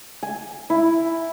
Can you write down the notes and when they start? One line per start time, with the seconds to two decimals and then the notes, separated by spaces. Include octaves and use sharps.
0.23 G#5
0.70 E4